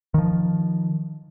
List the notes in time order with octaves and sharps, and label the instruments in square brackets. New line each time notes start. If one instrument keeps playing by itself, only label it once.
[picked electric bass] D#3 F3